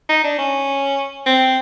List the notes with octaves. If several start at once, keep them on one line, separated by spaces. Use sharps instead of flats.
D#4
D4
C#4
C4